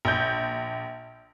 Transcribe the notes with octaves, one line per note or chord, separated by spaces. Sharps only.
A#1 G6